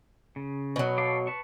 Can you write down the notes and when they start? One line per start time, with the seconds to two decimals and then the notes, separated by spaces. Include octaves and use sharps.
0.36 C#3
0.76 B2 F#3
0.98 A4 F5 D6
1.27 B4 A5 C#6